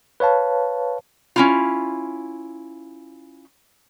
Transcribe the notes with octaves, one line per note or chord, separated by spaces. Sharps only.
B4 C#5 F5 A5
C#4 E4 F4